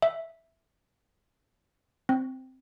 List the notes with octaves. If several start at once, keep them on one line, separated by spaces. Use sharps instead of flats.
E5
C4